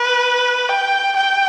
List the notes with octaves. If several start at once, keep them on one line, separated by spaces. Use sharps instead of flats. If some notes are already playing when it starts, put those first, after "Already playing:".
Already playing: B4
G5
G5